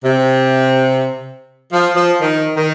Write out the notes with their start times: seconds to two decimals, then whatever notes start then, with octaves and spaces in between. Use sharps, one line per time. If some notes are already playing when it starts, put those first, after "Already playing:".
0.04 C3
1.72 F3
1.96 F3
2.20 D#3
2.56 D#3